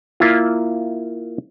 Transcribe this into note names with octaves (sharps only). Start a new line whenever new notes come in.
A#3 E4 F4